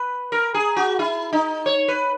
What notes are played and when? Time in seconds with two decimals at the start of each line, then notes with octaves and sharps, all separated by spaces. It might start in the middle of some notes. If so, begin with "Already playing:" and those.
Already playing: B4
0.32 A#4
0.54 G#4
0.76 F#4
0.99 E4
1.33 D#4
1.66 C#5
1.88 B4